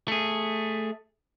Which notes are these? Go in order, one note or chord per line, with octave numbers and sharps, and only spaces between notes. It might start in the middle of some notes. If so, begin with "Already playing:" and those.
A3 G#4